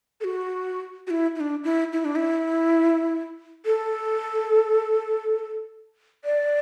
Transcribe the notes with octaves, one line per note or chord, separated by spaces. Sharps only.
A4
F#4
F#4
E4
E4
D4
E4
E4
D4
E4
A4
D5